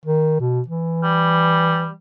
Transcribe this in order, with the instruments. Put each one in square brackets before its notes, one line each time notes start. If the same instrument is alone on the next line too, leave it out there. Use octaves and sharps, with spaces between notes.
[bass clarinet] D#3
B2
E3
[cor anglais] G3